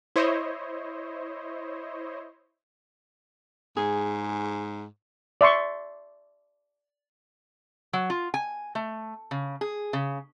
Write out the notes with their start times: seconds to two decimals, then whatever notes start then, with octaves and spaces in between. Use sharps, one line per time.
0.16 E4 C5 C#5 D#5
3.77 G#2 G#4
5.41 D5 E5 C6 C#6
7.93 F#3
8.10 F4
8.34 G#5
8.75 A3
9.31 C#3
9.61 G#4
9.93 C#3